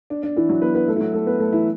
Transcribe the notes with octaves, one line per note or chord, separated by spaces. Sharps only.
D4
D4
E3 E4
F#3 F#4
B3 B4
B3 B4
A3 A4
E4
F#3 F#4
A3 A4
B3 B4
A3 A4
E3 E4